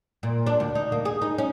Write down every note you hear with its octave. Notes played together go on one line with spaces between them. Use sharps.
A#2
D4
D2
D#4
A#3
G#4
D#4
C#4